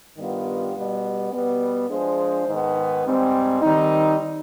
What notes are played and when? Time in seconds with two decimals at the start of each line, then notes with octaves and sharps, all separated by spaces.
0.17 G2 D#3 G3 B3 F4
0.74 B2 G3 B3
1.31 B2 G3 B3
1.89 F3 G#3 D4 G#4 C5
2.47 G#2 D#3 B3
3.04 G#2 G3 C4
3.61 D#3 G3 C4 D#4